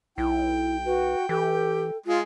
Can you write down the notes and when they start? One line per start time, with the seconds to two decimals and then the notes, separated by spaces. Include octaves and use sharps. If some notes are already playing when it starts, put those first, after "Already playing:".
0.18 B1 E4 G5
0.85 F#4 B4
1.29 E3 G4 A4
2.06 G#3 F4